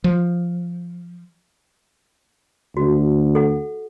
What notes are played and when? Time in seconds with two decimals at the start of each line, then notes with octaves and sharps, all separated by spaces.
0.04 F3
2.77 D2 F#4
3.35 A4 F#5